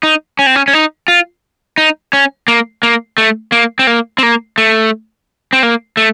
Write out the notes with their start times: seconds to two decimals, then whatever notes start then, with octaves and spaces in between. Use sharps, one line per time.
0.03 D#4
0.39 C#4
0.46 C4
0.56 C#4
0.68 C#4
0.73 D#4
1.08 F4
1.78 D#4
2.13 C#4
2.48 A#3
2.83 A#3
3.18 A3
3.52 A#3
3.79 C4
3.87 A#3
4.18 C4
4.23 A#3
4.58 A3
5.53 C4
5.63 A#3
5.97 A3